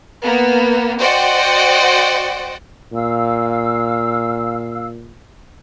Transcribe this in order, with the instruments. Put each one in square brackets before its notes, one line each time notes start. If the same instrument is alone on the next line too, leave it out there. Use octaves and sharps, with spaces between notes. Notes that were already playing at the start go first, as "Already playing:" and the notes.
[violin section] A#3 B3
F#4 C5 D5 D#5 F#5 G5
[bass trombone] A#2 [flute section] F5 E6